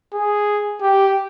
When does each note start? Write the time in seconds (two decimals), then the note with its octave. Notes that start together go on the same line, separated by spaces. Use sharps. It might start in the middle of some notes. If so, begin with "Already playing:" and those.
0.14 G#4
0.82 G4